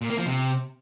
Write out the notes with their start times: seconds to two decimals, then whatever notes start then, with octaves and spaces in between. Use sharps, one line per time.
0.02 A#2
0.10 A#3
0.18 F3
0.27 C3